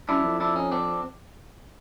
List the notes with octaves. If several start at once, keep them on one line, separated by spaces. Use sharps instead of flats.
F#2 D4 E4
F2
D4 E4
C#4 D#4
C4 D4